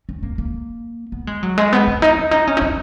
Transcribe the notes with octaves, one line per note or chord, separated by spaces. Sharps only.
C#4
A#3
A#3
B3
G#3
F#3
G#3
B3
B3
D#4
C#4
D#4
C#4
D#4
C#4